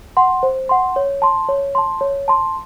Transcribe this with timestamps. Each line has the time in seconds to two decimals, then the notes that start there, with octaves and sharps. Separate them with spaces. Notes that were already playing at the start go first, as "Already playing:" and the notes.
0.17 F#5 C6
0.43 C5
0.69 F#5 C6
0.96 C#5
1.22 A5 C6
1.49 C#5
1.75 A5 C6
2.01 C#5
2.28 A5 C6